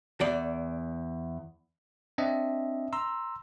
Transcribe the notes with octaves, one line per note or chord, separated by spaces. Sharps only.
E2 D5
C4 D4 D#5 E5
A#5 C6 E6